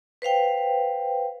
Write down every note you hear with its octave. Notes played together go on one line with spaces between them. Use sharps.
B4 C5 F5 G5